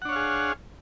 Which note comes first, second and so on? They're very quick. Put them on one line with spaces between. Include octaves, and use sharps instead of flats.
F#5 D4 C#5 F5 G#4